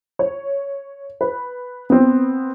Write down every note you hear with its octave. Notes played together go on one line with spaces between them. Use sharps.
C#5
B4
B3 C4